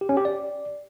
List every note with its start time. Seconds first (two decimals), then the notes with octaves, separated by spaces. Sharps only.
0.01 G4
0.09 C#4
0.17 G4
0.25 D5